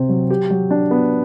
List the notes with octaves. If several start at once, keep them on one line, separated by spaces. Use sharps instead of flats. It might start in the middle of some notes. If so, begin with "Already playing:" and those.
Already playing: C3 C4
F#3
G4
F#3
D4
B3